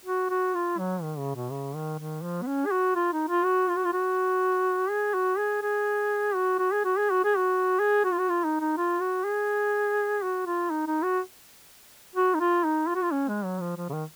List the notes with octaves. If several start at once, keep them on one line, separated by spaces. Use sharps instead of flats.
F#4
F#4
F4
F#3
D#3
C#3
B2
C#3
D#3
D#3
F3
B3
C#4
G#4
F#4
F4
D#4
F4
F#4
F4
F#4
F4
F#4
G#4
F#4
G#4
G#4
F#4
F#4
G#4
F#4
G#4
F#4
G#4
F#4
G#4
F#4
F4
F#4
F4
D#4
D#4
F4
F#4
G#4
F#4
F4
D#4
D#4
F#4
F#4
D#4
F4
D#4
F4
F#4
F4
C#4
G#3
F#3
F3
F3
C#3
D#3